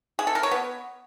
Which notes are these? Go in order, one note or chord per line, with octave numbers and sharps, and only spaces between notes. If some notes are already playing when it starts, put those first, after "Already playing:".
G#4
A4
A#4
C#5
B3